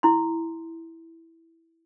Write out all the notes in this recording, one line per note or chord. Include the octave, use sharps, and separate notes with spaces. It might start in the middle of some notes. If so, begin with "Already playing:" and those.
E4 C6